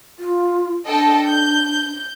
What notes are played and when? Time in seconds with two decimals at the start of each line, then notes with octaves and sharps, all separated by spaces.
0.19 F4
0.86 D4 A4 D#5 G5
1.26 G6